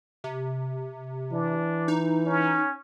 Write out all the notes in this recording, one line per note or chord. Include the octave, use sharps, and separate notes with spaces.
C3
E3 D4
D#4
C#4